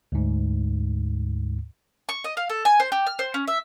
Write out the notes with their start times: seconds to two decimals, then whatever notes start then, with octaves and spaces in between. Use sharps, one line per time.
0.12 D2 G#2
2.09 C#6
2.24 D#5
2.37 F5
2.50 A4
2.65 G#5
2.80 C5
2.92 G4
3.07 F6
3.19 C5
3.34 C#4
3.48 E5